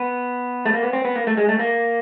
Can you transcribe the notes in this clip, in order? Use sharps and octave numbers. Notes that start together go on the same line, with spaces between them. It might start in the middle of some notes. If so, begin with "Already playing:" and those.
Already playing: B3
A3
A#3
B3
C4
B3
A#3
A3
G#3
A3
A#3